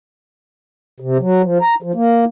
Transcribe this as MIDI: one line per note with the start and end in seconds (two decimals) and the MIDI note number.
1.00 1.18 48
1.20 1.42 54
1.43 1.58 53
1.61 1.75 82
1.82 1.92 53
1.94 2.25 58